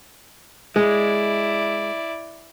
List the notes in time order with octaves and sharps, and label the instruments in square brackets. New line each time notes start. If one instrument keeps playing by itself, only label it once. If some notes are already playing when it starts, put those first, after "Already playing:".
[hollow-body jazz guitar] G#3 [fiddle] E4 D5